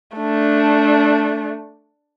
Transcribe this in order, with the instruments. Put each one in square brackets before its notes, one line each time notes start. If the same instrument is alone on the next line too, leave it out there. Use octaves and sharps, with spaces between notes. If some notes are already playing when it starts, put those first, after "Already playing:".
[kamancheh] A3 D4